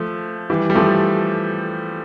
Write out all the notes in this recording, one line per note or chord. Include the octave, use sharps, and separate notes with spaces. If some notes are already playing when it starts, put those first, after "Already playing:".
Already playing: F3 A3
E3 G3
G3
F3 A3